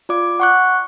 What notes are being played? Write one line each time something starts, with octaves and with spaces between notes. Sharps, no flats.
F4 D5 D6
F#5 C#6 F#6